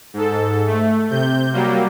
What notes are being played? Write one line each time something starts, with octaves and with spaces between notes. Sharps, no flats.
G#2 A4
A3
C3 G6
F#3 G3 A#3